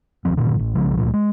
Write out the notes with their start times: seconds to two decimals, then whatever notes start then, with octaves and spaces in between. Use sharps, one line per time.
0.25 D1 F3 C4
0.37 G2 A#2 D3 D#3
0.59 A1
0.75 B1 C#3 F3 G#3
0.97 C#2 G2 A#2 F3
1.09 G3 G#3